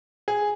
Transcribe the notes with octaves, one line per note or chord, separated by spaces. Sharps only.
G#4